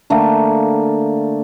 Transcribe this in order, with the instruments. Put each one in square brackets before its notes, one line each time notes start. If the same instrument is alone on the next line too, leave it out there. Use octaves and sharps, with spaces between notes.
[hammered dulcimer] D3 A3 A#3 F5